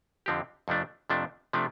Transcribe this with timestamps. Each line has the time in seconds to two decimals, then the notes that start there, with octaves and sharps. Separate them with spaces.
0.26 F2 D3 F3 C4 G4
0.68 F2 C3 F3 A3 D4
1.10 F2 C3 F3 A3 D4
1.53 C3 F3 A3 D4